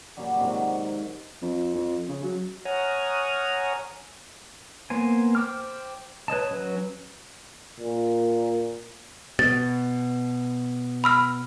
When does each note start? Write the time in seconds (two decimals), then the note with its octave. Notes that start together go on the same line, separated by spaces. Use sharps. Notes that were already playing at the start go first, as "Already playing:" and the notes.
0.17 A#2 C#3 F#3 G3
0.39 G#2 C3 D#3 F#3
1.42 F2
1.75 F2
2.08 C#3
2.23 F#3
2.65 C#5 F#5 G#5 A#5 D#6 F6
4.90 A#3 B3 C5 G#5
5.35 C5 G5 D6 F6
6.28 B4 C#5 D#5 A5
6.51 F#3 C#4 B4
7.80 A#2
9.39 B2 A6
11.04 B5 E6 F6